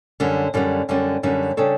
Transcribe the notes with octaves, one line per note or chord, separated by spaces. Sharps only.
F#2 D3 G3 C#4
F#2 D3 G3 C#4
F#2 D3 G3 C#4
F#2 D3 G3 C#4
C#3 G3 D4 A4 C#5